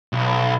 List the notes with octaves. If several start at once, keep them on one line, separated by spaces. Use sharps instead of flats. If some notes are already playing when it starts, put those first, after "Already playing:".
B1